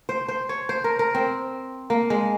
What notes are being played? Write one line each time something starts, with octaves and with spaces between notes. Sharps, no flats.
C5
C5
C#5
C5
A#4
A#4
C4
A#3
G#3